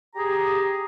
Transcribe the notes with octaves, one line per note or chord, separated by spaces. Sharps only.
G4 G#4 A#5